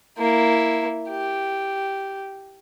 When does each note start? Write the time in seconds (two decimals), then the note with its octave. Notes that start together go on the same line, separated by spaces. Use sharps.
0.18 A#3 E4
1.10 G4